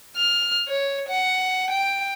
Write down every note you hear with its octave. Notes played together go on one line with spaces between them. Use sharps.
F6
C#5
F#5
G5